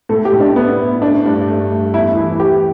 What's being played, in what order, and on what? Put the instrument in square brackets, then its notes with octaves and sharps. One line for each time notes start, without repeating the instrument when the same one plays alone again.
[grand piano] A2 [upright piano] A4
[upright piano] G4
[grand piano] A2
[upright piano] D4
[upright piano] B3 [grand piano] E4
[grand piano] E4
[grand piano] A3 [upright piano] D4
[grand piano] G2
A3
A3
[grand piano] E2 [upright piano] E4
[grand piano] E3
[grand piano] B3 [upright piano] G4